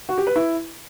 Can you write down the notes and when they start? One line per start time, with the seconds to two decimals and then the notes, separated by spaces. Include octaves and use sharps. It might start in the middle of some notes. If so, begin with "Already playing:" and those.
0.09 F#4
0.18 G4
0.27 B4
0.36 E4